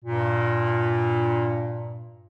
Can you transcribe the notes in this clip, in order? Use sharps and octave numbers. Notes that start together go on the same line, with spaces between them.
G2 A#2